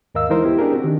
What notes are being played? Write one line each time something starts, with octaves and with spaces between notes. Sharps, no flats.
D#2 G#2 A#4 D#5 F5 E6
E3 G#3 D#4 E4 A#4 C5
B3 E4 G4
C#4 D4 G4 G#4 A#4
C4 F#4
D#3 D4